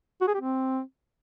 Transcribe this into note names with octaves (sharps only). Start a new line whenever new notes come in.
F#4
G#4
G4
C4